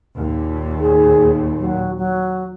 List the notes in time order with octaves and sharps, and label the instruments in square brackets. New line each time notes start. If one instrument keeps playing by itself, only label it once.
[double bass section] D#2 A#2
[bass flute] G#4
F#3
F#3